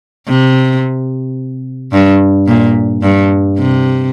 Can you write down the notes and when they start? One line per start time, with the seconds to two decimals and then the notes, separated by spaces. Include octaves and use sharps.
0.28 C3
1.92 G2
2.47 A#2
3.03 G2
3.58 C3